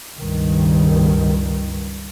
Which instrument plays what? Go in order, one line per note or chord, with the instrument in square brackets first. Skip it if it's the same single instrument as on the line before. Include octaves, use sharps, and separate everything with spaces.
[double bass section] C#2 G2 D#3